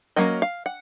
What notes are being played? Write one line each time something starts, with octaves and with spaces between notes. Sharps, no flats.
F#3 A#3 C#4 D#5
F5
F#5